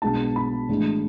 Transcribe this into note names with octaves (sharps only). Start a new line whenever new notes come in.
B1 B2 G#3 B3 D4 A5
B5
A2 E3 G#3 D4